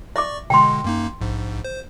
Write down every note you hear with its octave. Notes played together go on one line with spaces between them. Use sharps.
D5 E5 C#6 D6
B2 D3 G#3 G5 C6
F#2 A#3 D#4
A#1 G#2
C5